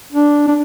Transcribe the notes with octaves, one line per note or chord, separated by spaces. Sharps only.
D4
D4